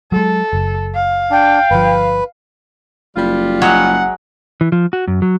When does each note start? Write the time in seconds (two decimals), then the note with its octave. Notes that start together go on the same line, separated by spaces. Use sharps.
0.12 F#3 G#3 A4
0.53 F#1
0.95 F5
1.31 D4 G5
1.71 G1 F3 B4
3.16 F#1 G3 F4
3.62 F#3 G#3 C#5 F#5
4.61 E3
4.72 F3
4.93 F#4
5.07 F#2
5.22 F#3